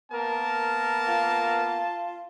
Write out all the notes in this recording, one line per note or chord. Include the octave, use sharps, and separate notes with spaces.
A#3 B3 A#4 A5
F4